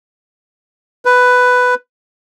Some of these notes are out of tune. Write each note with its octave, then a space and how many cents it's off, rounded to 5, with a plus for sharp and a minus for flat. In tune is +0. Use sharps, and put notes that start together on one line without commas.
B4 +10